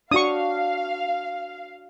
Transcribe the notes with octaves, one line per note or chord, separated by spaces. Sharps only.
D4 F#4 F5 C#6 D#6